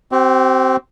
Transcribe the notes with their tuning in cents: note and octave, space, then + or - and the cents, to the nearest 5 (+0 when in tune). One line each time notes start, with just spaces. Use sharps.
C4 +0 G4 -45